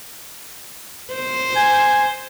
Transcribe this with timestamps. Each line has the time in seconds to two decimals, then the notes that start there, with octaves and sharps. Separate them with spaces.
1.14 C5
1.56 G#5